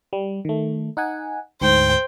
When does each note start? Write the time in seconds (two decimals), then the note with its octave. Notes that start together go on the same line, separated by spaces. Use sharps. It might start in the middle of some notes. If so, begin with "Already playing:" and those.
0.13 G3
0.45 D#3 A3
0.97 D#4 F#5 G#5
1.61 D2 G#2 C5 G5